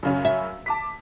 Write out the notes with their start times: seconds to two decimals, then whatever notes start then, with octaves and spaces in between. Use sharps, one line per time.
0.03 F#2 C#3 C#4
0.25 E5
0.66 A5 D6 B6